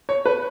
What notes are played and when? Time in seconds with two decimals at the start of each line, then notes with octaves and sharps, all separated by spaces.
0.09 C#5
0.25 B4